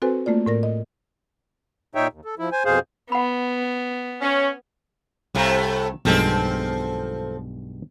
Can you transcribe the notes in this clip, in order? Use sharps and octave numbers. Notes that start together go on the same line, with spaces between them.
C4 F#4 A4 B4 C5 G#5
A3 A#3 F4 D5
A2 A#3 A#4 D5 A#6
D#5
A#2 D#4 C#5 E5 G5
D#2
A4
F3 E4
C5 G#5
F2 B2 G#4 C5 F5
B3 F#5 B5
C#4
C2 A2 C3 A3 F5 A#5
B1 G2 F3 G#3 C4 A4